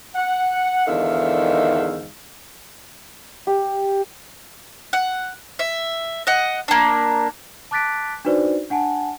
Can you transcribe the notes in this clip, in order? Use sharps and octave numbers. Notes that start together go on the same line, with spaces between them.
F#5
E2 G#2 D3 D#3 E5 F5
G4
F#5
E5
D#5 F#5
A#3 D4
A5 D6 F#6 A6 B6 D7
D4 D#4 F#4 B4 C5 D5
D4 F#5 G#5 A5